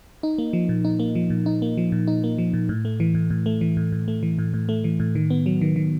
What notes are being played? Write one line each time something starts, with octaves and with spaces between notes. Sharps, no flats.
D#4
A#3
F3
A#2
D#4
A#3
F3
A#2
D#4
A#3
F3
A#2
D#4
A#3
F3
A#2
A2
A3
E3
A2
A2
A3
E3
A2
A2
A3
E3
A2
A2
A3
E3
A2
D#3
B3
F#3
D#3
D#3